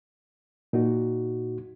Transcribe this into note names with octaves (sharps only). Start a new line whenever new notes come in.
A#2 D#4 F#4